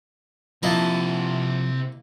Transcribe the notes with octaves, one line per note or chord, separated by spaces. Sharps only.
C3 F3 A#3 E4 D#5 A5